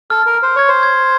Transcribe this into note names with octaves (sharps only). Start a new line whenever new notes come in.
A4 F6
A#4
F6
C5
C#5 G#6
C5
G#6